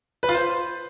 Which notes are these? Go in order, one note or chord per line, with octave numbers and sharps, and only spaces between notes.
B4
F4
C5